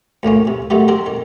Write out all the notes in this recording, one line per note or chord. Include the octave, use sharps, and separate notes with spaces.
D2 A2 A#3 C#4
C3
C3 D#3 F#3 A3 G4
C4 G4 A#4
D#3